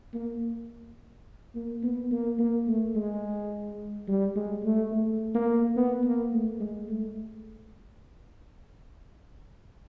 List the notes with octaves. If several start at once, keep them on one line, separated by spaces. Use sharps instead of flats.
A#3
A#3
B3
A#3
A#3
A3
G#3
G3
G#3
A3
A3
A#3
B3
A#3
A3
G#3
A3